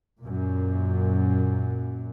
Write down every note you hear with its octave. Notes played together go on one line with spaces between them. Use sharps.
F#2 A#2